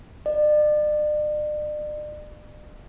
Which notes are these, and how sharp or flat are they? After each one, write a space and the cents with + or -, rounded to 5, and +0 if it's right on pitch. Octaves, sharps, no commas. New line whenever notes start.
D5 +40